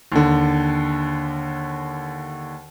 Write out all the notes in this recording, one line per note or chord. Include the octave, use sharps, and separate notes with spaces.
D#2 D3